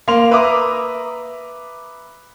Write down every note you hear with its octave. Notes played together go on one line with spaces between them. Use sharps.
A#3 C6 F7
B4 E5 A#5 D6 D#6